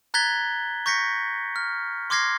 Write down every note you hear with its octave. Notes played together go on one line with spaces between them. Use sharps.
A#5 F#6 G#6 A6 B6 G7
C#6 G6 A#6 B6 C#7
F6
C6 D6 F6 G#6 A#6 C7